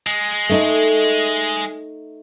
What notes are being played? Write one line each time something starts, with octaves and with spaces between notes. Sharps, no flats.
G#3
A3 D#4